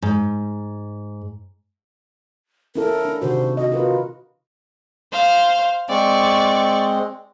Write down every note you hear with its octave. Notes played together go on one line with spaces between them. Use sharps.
G#2
C#4 E4 A4 A#4
D4
C3 D#3 F#4 C5
F#4 D#5
F4 F#4 A#4 B4
C5 F5
G#3 C4 D5 C#6